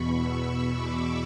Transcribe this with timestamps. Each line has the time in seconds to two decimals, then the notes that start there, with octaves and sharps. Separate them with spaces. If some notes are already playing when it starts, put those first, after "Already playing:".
Already playing: E2 B2 B5 C#6
0.14 E6
0.71 D6